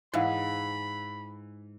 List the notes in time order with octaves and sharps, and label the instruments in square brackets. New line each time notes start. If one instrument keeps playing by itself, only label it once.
[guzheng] G#2 [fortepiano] E3 [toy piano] C5 F5 F#5 [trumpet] B5